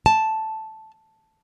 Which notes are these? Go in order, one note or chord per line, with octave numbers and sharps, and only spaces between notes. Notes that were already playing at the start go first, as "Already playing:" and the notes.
A5